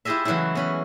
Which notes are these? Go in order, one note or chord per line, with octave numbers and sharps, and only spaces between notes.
E4 F4 G4 G#4 D#5 E5
C#3 E3 F#3 G#3 A3 E4
B3 C#4 B5